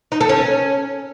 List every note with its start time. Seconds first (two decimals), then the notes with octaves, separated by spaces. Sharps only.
0.12 D#4
0.21 A4
0.29 C#4